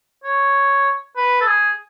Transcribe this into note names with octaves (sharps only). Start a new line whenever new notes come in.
C#5
B4
A4
G#4